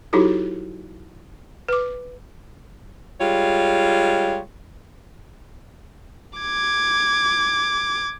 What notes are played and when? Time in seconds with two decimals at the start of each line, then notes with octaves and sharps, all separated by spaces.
0.13 F#3 D#4 E4 F#4 G4 A4
1.69 B4 D6
3.20 G3 G#3 F4 C#5
6.38 D6 G#6